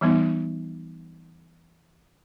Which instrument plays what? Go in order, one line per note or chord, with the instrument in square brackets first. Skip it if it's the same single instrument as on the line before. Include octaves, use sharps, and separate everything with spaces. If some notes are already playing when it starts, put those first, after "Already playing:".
[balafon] E3 G3 B3 D#4